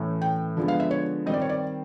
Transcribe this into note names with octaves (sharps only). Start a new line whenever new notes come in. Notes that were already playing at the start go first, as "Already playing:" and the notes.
Already playing: A2 E3 A3 C#4
G5
D3 F3 G#3 B3
F5
E5
C#5
D#3 G3 C4 D#5
D5
C#5
D5